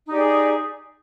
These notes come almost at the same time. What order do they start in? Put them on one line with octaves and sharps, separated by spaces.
D#4 G4 D5 G#4